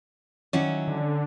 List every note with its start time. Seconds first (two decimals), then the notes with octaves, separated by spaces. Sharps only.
0.53 D#3 F#3 C#4 E4
0.88 D3